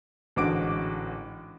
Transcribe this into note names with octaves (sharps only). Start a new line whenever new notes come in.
A1 G#2 D3 F#4 D6 D7